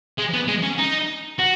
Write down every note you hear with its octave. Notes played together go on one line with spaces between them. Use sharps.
G#3
B3
G#3
C#4
D#4
F#4